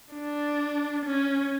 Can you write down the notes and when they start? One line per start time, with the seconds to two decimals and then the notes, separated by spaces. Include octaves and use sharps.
0.15 D4
1.06 C#4